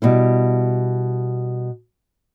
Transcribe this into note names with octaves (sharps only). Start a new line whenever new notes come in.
B2 G3 E4